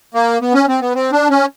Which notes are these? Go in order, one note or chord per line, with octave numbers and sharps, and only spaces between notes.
A#3
B3
C#4
C4
B3
C4
D4
C#4